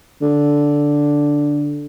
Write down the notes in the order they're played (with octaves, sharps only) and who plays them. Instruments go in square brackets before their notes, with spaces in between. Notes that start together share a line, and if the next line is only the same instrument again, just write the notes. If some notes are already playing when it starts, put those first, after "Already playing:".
[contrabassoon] D3